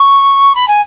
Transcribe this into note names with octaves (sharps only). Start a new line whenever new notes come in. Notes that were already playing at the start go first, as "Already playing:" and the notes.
Already playing: C#6
B5
G#5